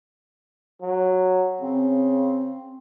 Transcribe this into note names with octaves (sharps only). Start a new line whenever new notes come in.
F#3
C#3 C4